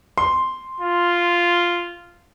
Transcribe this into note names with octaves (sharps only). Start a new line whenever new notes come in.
C6
F4